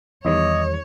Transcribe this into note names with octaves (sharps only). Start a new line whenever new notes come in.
E2 D#3 G3 C#5 D#5